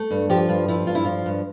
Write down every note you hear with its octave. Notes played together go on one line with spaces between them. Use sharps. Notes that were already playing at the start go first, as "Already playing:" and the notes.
Already playing: A3
G2
F3 G4
G2 F4
F3 E4
G2 F4
E4
F3 F4
G2